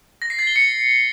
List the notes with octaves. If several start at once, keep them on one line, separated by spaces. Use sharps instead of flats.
A#6
C7
A6
G7
C#7